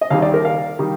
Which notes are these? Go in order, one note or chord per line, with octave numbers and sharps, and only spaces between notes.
D#5
D#2 D#3 G3 F5
D5
A#4
F5
D#3 G3